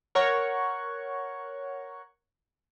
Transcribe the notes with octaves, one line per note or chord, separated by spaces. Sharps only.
A#4 C#5 F#5 C#6